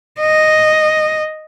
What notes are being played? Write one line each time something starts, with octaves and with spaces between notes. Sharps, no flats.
D#5